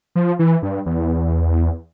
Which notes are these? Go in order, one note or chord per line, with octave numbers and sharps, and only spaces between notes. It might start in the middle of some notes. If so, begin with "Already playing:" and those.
F3
E3
G2
E2